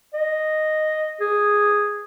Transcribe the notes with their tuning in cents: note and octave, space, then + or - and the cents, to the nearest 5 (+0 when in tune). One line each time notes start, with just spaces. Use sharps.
D#5 -5
G#4 -5